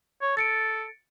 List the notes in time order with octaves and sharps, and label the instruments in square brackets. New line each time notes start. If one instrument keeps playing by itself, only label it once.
[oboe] C#5
[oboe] A4 [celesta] A6 C#7 D7